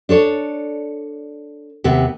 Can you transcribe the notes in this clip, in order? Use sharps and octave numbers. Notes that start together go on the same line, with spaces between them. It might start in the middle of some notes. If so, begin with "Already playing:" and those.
D4 A4 C#5
D#2 C3 B3